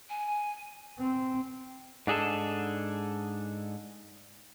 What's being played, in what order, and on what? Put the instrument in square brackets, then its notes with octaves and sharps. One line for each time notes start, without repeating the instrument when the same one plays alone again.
[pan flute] G#5
[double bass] C4
[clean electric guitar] G#2 D4 G#4 A4 A5